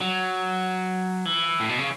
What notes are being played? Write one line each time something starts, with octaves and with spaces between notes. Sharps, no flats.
F#3
E3
A2
B2
C#3